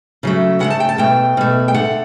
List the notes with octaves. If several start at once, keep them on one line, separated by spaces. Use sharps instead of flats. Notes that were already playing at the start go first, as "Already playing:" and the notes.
C#3 F#3 A3
C#3 F#3 A3 F#5
A5
G5
A5
B2 A3 G5
B2 A3
G5
D3 A3 F#5